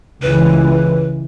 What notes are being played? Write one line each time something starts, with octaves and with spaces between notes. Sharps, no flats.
C#2 E3 B4